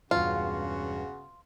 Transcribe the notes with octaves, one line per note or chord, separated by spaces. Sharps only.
E1 G2 C#3 F4 F#4